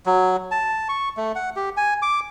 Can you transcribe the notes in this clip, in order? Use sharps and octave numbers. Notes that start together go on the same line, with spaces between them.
F#3
A5
C#6
A3
F#5
G4
G#5
D6